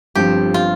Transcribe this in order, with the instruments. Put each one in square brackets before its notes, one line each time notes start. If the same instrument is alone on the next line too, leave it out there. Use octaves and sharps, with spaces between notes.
[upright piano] G1 G2 F3 C4 [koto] G4
[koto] F4